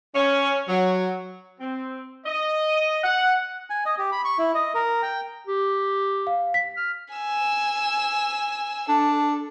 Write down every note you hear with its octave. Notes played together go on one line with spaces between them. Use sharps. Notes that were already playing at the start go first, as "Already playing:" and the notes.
C#4
F#3
C4
D#5
F#5
G#5
D#5
G4
B5
C#6
E4
D#5
A#4
G5
G4
F5
B6
F6
G#5 E6
D4 A4